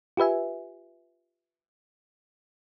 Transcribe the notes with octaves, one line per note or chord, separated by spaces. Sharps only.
F4 G4 B4 E5 G#5